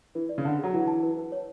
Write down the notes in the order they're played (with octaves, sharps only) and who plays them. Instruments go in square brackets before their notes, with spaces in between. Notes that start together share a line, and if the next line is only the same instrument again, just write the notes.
[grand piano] E3 [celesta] B4
[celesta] D5
[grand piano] C#3
[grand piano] D3 [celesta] F#5
[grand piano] F#3 [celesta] G#4
[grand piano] E3 [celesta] F#5
[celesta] A5
B4
B4
C#5